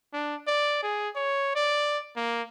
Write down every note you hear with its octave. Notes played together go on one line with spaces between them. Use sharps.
D4
D5
G#4
C#5
D5
A#3